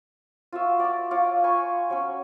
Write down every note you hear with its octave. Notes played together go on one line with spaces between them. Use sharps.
F4 F#4 E5
D5 D6
F4 C#5 F5 D6
G#5 B5 C#6
F#3 C#4